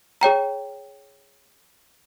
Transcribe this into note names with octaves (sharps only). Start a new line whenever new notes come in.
G#4 C#5 G5 A#5